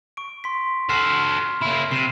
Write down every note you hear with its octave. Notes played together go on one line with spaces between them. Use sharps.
C#6 D7
C6 B6
F#4 A4 C6 F6 C7
A#3 E4 B5
C3 C7 E7